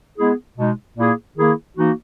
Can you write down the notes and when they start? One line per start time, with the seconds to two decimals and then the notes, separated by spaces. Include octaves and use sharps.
0.18 G#3 B3 E4 G#4
0.58 B2 G#3 D#4
0.98 A#2 A#3 E4 G#4
1.37 D#3 A#3 E4 G#4
1.77 E3 A#3 D#4 F#4